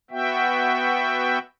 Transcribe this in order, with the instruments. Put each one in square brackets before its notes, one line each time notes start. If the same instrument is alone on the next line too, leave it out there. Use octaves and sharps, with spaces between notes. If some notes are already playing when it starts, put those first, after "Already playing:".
[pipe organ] B3 F#4 E5 G5